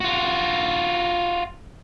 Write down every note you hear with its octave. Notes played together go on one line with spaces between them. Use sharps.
F4 F#4